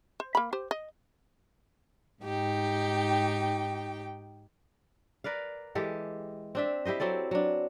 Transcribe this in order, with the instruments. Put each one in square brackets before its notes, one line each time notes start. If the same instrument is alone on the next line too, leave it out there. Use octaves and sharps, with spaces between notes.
[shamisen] C5
A#3 B5
G4 C5
D#5
[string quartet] G#2 D#4 G4 G5
[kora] A#4 B4 D5 F5
E3 G#3 G4 A4
C4 D4 E5
E4 G4 C5 D#5
F#3 C4 A4 D5
F#3 D4